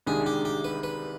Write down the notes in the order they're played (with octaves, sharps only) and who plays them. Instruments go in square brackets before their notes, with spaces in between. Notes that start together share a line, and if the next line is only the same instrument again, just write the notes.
[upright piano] C2 C3 D#3 G#3 D4 [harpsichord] G#4
[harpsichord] G4
G4
B4
B4